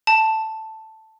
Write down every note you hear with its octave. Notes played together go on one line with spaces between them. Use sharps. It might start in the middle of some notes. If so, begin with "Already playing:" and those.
A5